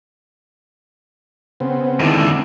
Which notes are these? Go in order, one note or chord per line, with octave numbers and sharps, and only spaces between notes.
C#3 B3 C4
F2 D3 D#3 G#3 E4